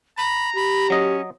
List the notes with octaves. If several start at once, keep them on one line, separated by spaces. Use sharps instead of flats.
A#5 B5
G4 B5
F#3 C#4 D#5